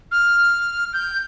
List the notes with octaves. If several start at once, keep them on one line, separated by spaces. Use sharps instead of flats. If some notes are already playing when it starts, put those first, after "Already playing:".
F6
G6